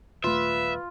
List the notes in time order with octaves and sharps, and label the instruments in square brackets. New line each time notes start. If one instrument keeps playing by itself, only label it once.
[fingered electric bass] D#1 A3 [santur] F4 [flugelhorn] B4 [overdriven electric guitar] E5